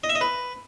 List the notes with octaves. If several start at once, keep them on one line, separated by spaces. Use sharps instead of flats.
D#5
E5
D#5
B4